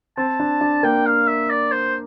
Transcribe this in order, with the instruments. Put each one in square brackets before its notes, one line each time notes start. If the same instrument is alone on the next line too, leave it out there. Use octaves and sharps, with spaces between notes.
[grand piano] C4 [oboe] A5
[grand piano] D4
D4
[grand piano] A#3 [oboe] G5
[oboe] F5
E5
D5
C5